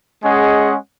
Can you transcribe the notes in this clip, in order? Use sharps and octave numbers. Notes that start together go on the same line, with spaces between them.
G#3 C#4 G#4 D#5 F#5